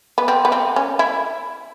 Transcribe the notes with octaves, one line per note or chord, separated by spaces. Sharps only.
B3
C4
B3
C4
C#4
E4